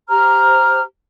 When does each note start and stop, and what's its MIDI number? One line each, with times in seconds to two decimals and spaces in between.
0.08 0.80 67
0.08 0.80 72
0.08 0.80 82
0.08 0.80 89